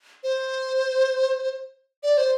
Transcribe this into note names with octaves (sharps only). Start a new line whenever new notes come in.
C5
D5
C5